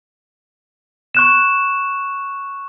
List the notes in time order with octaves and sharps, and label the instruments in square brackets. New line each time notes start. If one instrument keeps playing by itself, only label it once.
[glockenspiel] C#6 F#6 E7